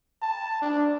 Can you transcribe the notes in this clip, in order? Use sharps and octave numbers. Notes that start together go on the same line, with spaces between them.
A5
D4